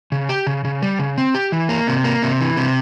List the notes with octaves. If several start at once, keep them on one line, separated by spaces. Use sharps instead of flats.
C#3
G4
C#3
C#3
G3
C#3
C4
G4
E3
A#3
C3
A#3
C3
E3
C3